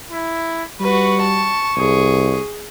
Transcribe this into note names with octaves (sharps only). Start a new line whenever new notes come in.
E4
G3 F#4 B4 C#6
A5
C2 G#4